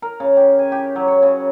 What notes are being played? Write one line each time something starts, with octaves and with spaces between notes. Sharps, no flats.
A#4
C#3
G4
G#5
G4
F#3
C#5
C#3